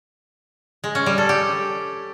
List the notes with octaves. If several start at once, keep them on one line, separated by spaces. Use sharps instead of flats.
G#3
C#4
G3
A4
G4